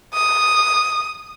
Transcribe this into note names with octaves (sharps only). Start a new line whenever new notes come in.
D#6